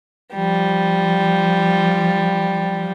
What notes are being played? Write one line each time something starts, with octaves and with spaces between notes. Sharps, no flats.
F3 G3